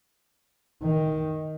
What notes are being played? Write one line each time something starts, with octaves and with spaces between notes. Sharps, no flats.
D#3